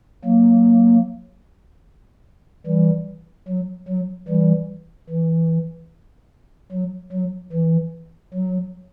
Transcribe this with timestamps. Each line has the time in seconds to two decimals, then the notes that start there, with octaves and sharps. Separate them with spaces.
0.24 F#3 A#3
2.67 E3 G3
3.48 F#3
3.88 F#3
4.28 E3 G3
5.10 E3
6.71 F#3
7.12 F#3
7.53 E3
8.33 F#3